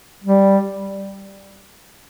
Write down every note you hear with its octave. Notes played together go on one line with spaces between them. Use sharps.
G3